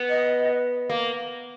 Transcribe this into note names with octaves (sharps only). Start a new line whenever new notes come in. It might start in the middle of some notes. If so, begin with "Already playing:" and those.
Already playing: B3
D#5
A#3